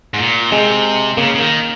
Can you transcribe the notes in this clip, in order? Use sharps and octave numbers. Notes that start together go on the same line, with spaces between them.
G#2
A#2
C3 G#3
C#3 A#3
C#3
D#3